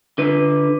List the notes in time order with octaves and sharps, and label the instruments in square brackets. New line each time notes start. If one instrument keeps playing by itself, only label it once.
[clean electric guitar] D3 B4